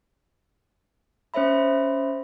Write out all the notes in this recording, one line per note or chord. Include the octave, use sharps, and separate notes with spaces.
C#4 C5 C#5 E5 B5